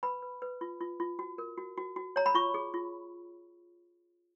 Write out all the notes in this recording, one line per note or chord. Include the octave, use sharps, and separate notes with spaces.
B4 B5
B4
B4
F4
F4
F4
F#4
A#4
F#4
F#4
F#4
C#5 A#5
B5
F4 C#6
G#4
F4